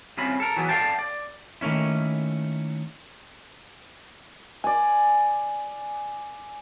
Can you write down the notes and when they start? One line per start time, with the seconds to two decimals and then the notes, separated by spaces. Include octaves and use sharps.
0.17 C2 C3 C#4 F4 B5
0.40 A4 A#4
0.56 E3 F#3 B3
0.69 A4 D5 E5 F5 G5 A5
0.99 D5
1.61 D#3 A3 A#3 C#4 E4
4.64 D5 G#5